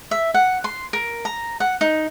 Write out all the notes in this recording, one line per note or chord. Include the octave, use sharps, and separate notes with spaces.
E5
F#5
C6
A#4
A#5
F#5
D#4